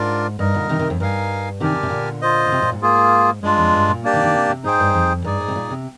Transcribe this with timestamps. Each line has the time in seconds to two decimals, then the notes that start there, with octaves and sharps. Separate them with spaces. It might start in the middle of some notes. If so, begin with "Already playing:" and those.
Already playing: G#2 D4 F4 A#4 D5
0.39 G2 D#4 A#4 D#5
0.54 A#2 D3
0.69 C3 D#3
0.79 C3 D#3
0.90 F2
1.00 G2 D#4 A#4 F5 G#5
1.60 C3 D#3 D4 G4 A#4 D5 G#5
1.76 D3
1.83 C3
1.90 A#2 D3
2.22 F4 C5 D#5
2.46 D3
2.52 C3
2.62 A#2
2.72 G#2
2.82 A#3 F4 G#4
3.43 G2 G#3 D4 F4
3.58 F2
3.74 G2
3.88 A#2
4.04 A#3 D4 G4 D5
4.13 C3 D#3
4.24 C3 D#3
4.34 C3
4.49 C3
4.64 G#2 D#4 G#4 C5 G5
4.80 G2
4.94 F2
5.24 G2 D#4 G#4 D5
5.41 G#2
5.48 C3
5.56 A#2
5.70 C3